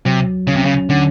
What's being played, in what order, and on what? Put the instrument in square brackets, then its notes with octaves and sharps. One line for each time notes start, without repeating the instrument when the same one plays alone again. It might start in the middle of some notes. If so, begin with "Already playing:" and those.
[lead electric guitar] C3 [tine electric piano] F#3
[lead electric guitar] C#3 [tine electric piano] C#4
[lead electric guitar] C3
C#3
[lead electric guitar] D3 [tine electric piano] C#4